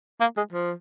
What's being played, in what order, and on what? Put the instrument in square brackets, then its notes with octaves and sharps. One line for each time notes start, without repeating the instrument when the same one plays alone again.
[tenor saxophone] A#3
G#3
F3